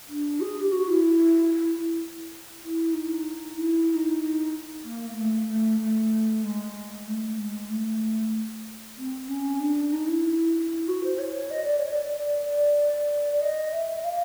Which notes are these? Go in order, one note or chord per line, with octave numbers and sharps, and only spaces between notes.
D4
G#4
G4
F#4
E4
E4
D#4
E4
E4
D#4
A#3
A#3
A3
A3
A3
G#3
A3
G#3
A3
C4
C#4
D4
D#4
E4
F#4
C5
C#5
D#5
D5
C#5
D5
D5
D5
D5
D#5
E5
F5